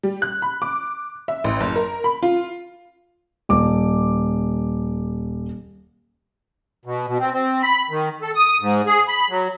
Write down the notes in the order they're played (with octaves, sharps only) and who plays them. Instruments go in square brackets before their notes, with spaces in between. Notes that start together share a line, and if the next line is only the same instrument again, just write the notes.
[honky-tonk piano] G3
F#6
B5
D6
E5
A1
F#1
A#4
B5
F4
[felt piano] D#1 D6
[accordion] B2
B2
C4
C4
B5
D#3
A4
D#6
G#2
G#4
B5
F#3